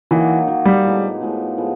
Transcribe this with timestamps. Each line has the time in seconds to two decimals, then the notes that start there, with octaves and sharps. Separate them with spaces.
0.11 D#3 E3 F#3 A#3 D#4
0.47 D#3 F#3 A#3 D#4
0.66 G3
0.84 A2 F3 G#3 B3
1.21 A2 F3 G#3 B3
1.57 A2 F3 G#3 B3